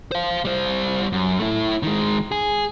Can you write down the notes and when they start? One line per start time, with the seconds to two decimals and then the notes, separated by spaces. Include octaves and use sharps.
0.12 C5 F5
0.45 G3 C5
1.12 F#2
1.39 A3 E4
1.83 D#3 G#3
2.32 G#4